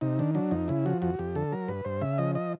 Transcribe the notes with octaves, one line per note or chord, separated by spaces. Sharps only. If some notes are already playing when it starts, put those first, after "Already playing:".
C3 D#4
D#3 D4
F#3 D4
F2 D#4
C#3 E4
F3 F#4
F2 F#4
F2 G4
D3 A4
F#3 A#4
G2 B4
G2 C5
C#3 E5
F3 D#5
D#5